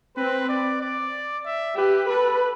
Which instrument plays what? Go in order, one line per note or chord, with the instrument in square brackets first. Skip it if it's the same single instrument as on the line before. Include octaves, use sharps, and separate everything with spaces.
[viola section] C4 [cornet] B4
[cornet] D5
D5
E5
[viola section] G4 [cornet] B4
[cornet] A4 [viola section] B4